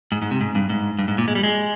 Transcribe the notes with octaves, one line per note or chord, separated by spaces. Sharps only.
G#2
G#2
C3
G#2
G2
G#2
G2
G#2
A#2
G#3
G3
G#3